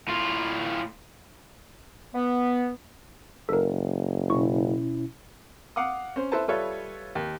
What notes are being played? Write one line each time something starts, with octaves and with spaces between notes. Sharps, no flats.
A2 F4
B3
F#1 A4 A#4
B2 C#4 E4 C#6
F5 F#5 D6 D#6
C#4 C5
E4 A4 B4 C5 A5
G3 F4 A4 B4 C#5 E5
D#2